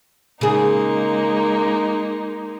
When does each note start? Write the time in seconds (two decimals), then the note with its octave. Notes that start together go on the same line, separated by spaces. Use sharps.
0.41 C#3 G#3 A#3 D#4 G#4